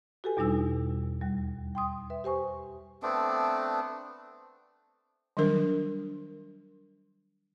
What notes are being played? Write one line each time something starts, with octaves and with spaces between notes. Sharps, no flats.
F#4 G4 A4 B4 G#5
E2 B2 G3 D4 D#4 E6
D#2 G3
G5 C6 D#6
B4 E5
G4 C5 G#5 C#6
A3 B3 C4 D4
D#3 F#3 G3 D4 A#4